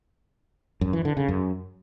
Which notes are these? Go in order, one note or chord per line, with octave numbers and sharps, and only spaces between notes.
F#2
E3
D3
C#3
F#2